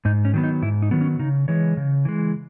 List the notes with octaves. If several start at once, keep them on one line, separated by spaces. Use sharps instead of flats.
G#2 D#4
C#4
D#3 F#3 B3
D#4
G#2 E4
D#4
D#3 F#3 B3
C#4
C#3 D#4
E3 G#3 C#5
C#3
E3 G#3